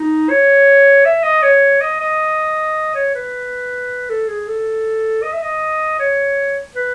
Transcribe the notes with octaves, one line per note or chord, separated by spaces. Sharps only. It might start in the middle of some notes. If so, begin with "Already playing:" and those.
Already playing: D#4
C#5
E5
D#5
C#5
D#5
D#5
C#5
B4
A4
G#4
A4
D#5
E5
D#5
C#5
B4